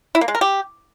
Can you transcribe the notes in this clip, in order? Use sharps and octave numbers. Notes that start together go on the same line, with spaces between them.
E4
A#3
G#3
A#4
G4